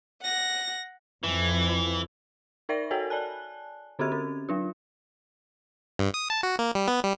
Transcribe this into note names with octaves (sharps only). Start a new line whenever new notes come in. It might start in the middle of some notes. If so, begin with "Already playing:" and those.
F#5 A#6
F2 E3
D#4 A#4 D5 E5 A#6
F#4 A4 A#4 C#5 G5 G#5
D5 G#5 A5 F#6
D3 C4 C#4 F#4 G4 G#6
C#4
F#3 D4 F4
G2
D#6
A5
F#4
A#3
G3
B3
G3